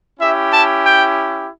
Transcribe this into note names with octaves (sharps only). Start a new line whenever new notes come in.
C#4 E4 G4 E5
A5
G5